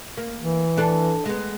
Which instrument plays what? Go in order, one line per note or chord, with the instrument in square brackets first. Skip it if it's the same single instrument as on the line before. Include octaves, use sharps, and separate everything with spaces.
[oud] A#3
[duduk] E3
[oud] D4 A4
G#3 B3